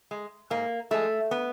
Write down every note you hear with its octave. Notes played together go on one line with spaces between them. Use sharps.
G#3
G#2 A#3
F3 G#3 A3
B3